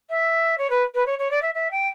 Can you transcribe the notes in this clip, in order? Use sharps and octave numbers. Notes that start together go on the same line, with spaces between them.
E5
C#5
B4
B4
C#5
C#5
D5
E5
E5
G5